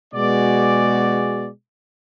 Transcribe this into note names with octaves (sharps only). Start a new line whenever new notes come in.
B2 G#3 B3 F#4 G#4 D5